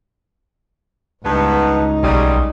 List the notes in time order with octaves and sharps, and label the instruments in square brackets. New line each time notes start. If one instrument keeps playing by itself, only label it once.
[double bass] C#2 D#4 [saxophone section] G2 B3
[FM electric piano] B1 C6 D#6 [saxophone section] C#3 F#3 G3